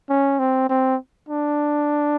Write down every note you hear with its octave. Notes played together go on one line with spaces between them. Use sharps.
C#4
C4
C4
D4